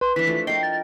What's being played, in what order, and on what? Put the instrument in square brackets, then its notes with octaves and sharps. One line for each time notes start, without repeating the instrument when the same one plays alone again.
[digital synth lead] B4 [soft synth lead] C6
[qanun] E3 D4 [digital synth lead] B4 [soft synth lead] B6
[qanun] F3 A3
[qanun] A#4 G5 [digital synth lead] D#5 [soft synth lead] C7
[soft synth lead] A6